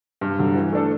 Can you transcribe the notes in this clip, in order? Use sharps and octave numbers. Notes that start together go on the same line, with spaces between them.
G2
D3 F#3
E3
A3 D4 A4